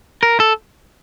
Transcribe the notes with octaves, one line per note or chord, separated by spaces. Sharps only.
A#4
A4